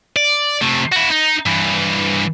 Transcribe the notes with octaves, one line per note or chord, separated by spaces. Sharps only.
D5
C3 A3
E4 F#4
D#4
G2 E3